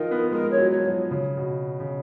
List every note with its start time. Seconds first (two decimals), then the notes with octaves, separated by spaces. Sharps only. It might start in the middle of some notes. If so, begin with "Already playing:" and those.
Already playing: D#3 F3 D#4 F4 A#4
0.11 B3
0.31 G#3 A#4
0.51 C#5
0.57 F#3
0.71 C#5
0.78 F3
0.85 F#3
1.11 C#3
1.37 B2
1.80 C#3